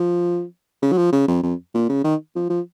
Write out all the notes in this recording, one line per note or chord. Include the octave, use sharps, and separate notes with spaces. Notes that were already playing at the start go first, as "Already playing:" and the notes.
Already playing: F3
C#3
F#3
F3
C#3
F2
F2
A#2
C#3
D#3
F3
F3